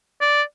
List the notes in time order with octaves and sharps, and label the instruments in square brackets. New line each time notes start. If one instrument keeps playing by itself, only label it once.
[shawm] D5